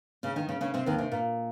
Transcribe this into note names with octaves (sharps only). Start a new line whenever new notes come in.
C#3 C#4
D#3 D#4
C#3 C#4
C#3 C#4
C3 C4
D#2 D#3
C3
A#2